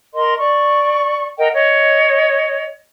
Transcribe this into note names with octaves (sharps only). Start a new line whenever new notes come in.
A#4 D#5 C6
D5 C#6
A#4 D#5 F#5 G5
C#5 D#5